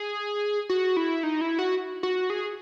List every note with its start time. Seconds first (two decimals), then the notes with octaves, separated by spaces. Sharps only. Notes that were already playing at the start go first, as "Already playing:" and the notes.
Already playing: G#4
0.69 F#4
0.97 E4
1.23 D#4
1.41 E4
1.59 F#4
2.03 F#4
2.30 G#4